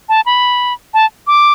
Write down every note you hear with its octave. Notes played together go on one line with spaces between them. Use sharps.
A5
B5
A5
D6